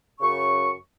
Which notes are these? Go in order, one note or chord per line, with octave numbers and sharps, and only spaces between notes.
F#2 C#3 C#6